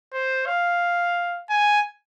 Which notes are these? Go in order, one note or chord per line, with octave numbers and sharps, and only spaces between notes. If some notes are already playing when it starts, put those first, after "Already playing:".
C5
F5
G#5